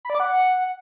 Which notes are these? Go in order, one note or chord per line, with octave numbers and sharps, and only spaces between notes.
B5
D5
D6
F#5